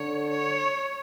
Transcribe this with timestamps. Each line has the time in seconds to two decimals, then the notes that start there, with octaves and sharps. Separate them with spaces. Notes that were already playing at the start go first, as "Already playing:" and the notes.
Already playing: D3 C#5
0.31 C#5